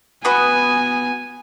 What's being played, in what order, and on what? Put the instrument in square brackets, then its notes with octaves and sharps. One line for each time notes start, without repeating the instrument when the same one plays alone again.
[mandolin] B3 F#4 [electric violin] G#5